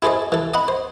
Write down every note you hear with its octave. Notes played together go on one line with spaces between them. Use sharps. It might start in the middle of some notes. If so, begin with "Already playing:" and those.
E4 G#4 A4 C5 D#5
E3 A4
D#5 F#5 A#5 B5
C5